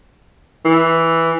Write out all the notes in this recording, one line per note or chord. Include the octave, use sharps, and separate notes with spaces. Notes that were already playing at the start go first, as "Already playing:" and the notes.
E3